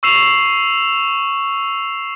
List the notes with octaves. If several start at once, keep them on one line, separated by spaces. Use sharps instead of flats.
C#6 E6 C7 E7 F7